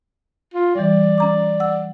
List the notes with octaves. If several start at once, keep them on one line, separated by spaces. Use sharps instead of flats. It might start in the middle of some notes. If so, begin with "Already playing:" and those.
F4
E3 G3 D5
C#4 A#5 D6
F#5 E6